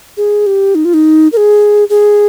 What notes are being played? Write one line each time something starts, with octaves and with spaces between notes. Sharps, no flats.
G#4
G4
D#4
F4
D#4
A#4
G#4
G#4